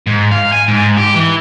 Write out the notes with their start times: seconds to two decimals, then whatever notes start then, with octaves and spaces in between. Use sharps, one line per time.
0.07 G#2
0.31 F5
0.52 G#5
0.68 G#2
0.98 G4
1.15 E3